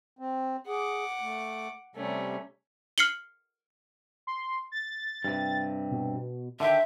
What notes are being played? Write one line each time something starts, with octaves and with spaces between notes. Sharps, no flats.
C4
G#4 F#5 D6
A3
C3 G3 A3 C#4
F6 C7 C#7 F#7 G7
C6
A6
G2 C3
B2
D3 D#3 G4 E5